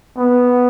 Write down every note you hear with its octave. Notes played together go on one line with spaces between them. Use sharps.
B3